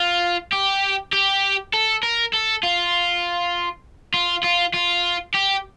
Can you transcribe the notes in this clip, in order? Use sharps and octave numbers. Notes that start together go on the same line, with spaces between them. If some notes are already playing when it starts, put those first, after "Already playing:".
Already playing: F4
G4
G4
A4
A#4
A4
F4
F4
F4
F4
G4